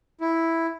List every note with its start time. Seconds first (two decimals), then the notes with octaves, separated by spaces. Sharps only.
0.21 E4